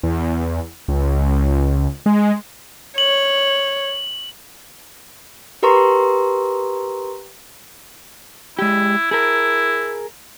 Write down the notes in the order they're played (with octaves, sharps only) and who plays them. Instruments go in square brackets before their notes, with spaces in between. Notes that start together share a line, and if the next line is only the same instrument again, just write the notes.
[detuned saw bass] E2
C#2
G#3
[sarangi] C#5 [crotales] F#7
[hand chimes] G4 A#4 B4 A#5 C6 C#6
[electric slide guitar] G#3 G4 [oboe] E4
[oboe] E4 [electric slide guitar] G#4 A#4